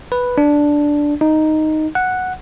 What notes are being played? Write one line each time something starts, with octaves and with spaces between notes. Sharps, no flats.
B4
D4
D#4
F#5